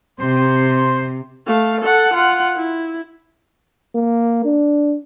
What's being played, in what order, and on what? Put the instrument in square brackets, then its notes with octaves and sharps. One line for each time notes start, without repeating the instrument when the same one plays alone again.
[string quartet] C3 [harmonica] C5 C6
[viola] A3 F5
A4 F#5
F4 F#5
E4
[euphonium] A#3
D4